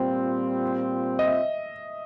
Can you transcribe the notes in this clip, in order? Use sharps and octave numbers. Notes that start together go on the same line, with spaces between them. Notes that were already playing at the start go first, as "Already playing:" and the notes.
Already playing: A#2 G3 C4 F4
D#5
E5